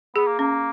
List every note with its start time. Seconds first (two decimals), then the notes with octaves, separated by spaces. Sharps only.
0.16 B3 G#4
0.28 A#3
0.39 A#3 C#4